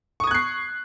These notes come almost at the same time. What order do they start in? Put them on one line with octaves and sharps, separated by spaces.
C#6 D#6 G#6 F#6 C7